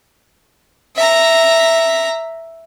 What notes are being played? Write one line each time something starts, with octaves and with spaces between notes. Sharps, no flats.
E5 A#5